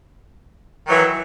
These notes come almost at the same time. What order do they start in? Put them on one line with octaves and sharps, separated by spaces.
D#3 F#3 E3